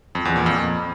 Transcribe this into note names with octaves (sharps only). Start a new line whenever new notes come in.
F2
E2
A#2
F2